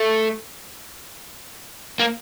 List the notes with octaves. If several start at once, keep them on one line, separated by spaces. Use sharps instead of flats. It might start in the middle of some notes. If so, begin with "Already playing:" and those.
Already playing: A3
A#3